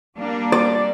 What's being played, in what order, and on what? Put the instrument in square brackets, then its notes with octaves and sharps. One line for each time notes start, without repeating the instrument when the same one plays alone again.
[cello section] G3 A#3 D4
[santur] D5